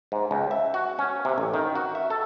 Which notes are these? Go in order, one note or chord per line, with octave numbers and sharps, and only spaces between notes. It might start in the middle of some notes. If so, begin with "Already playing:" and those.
G#2
C#2
E5
F#4
C#4
C3
A1
D#3
F#4
E5
A4